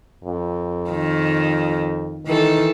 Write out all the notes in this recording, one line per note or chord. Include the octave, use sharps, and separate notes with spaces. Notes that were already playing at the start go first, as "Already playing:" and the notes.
F2
D#3
D#3 E3 A4